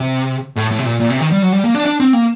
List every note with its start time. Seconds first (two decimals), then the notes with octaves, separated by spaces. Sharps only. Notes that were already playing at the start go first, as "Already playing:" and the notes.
Already playing: C3
0.56 A2
0.71 A2
0.79 C3
0.85 A#2
1.00 A#2
1.10 C3
1.20 D#3
1.32 G3
1.42 F#3
1.53 G3
1.64 A#3
1.75 D4
1.85 D4
2.00 C4
2.13 A#3